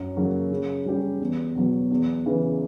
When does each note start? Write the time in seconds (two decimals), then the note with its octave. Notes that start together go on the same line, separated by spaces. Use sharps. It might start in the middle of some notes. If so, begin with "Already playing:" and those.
Already playing: F#2
0.16 C#3 F#3 A#3
0.51 C#3
0.85 G3 C#4 G4
1.20 E2
1.55 B2 F#3
1.91 E2
2.25 C#3 E3